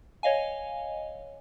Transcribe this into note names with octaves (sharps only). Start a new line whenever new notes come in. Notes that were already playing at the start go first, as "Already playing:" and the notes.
C#5 D#5 F5 G#5